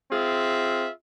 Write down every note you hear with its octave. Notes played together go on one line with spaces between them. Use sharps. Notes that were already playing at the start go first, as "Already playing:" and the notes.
C4 F4 G#4 E5